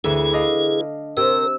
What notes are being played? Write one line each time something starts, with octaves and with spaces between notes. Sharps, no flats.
D2 E3 E4 G#4
D4 D#5 F5
C3 A#4 E6